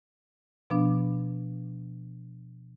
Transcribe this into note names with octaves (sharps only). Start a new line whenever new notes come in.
B2 F3 B3 D4